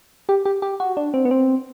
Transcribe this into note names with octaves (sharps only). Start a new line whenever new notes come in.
G4
G4
G4
F#4
D4
C4
B3
C4